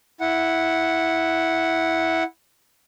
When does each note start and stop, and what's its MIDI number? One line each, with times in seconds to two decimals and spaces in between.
0.20 2.23 64
0.20 2.23 78